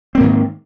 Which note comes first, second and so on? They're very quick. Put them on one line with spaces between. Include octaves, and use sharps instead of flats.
C4 A#3 G#2 D#3